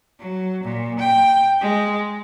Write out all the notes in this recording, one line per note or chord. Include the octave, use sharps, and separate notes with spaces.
F#3
A#2
G5
G#3